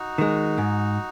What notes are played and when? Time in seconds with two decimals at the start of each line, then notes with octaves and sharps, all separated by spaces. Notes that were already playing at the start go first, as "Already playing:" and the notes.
Already playing: D#4 F#4
0.18 D#3 G#3
0.58 G#2